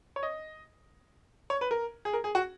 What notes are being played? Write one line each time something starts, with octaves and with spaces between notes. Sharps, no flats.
C#5
D#5
C#5
B4
A#4
G#4
A#4
G#4
F#4